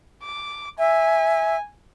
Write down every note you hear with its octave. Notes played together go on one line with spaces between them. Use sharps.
D6
E5 G#5